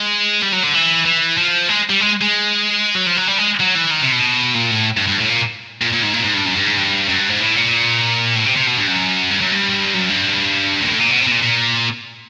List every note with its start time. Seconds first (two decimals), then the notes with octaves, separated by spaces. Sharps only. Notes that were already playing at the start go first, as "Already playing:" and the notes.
Already playing: G#3
0.42 G3
0.52 F#3
0.63 D3
0.74 E3
1.05 E3
1.38 F3
1.69 G#3
1.90 G3
2.00 G#3
2.22 G#3
2.95 F#3
3.07 F3
3.17 F#3
3.27 G3
3.38 G#3
3.60 F#3
3.75 E3
3.91 D#3
4.02 C3
4.12 B2
4.55 A#2
4.71 A2
4.97 G2
5.07 G2
5.18 A2
5.29 A#2
5.81 A#2
5.92 A#2
6.03 G#2
6.13 A#2
6.24 G#2
6.34 G2
6.45 F#2
6.56 G2
6.66 G#2
6.77 G2
7.09 F#2
7.19 G2
7.29 G#2
7.40 A2
7.56 A#2
8.36 A2
8.46 C3
8.57 C3
8.67 B2
8.78 G2
8.88 F#2
9.30 G2
9.41 F#2
9.52 G2
9.94 F#2
10.10 G2
10.81 A#2
10.89 A2
10.99 A#2
11.11 B2
11.21 C3
11.27 B2
11.31 A#2
11.42 A#2